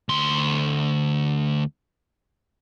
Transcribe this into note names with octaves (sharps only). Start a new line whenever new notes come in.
D2 C6